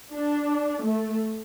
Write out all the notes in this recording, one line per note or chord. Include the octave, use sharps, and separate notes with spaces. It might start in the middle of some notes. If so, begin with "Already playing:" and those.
D4
A3